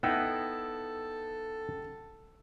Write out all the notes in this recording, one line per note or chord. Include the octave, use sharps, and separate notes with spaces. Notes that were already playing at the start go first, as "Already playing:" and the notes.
B3 D#4 E4 A4 F#5 G5 E6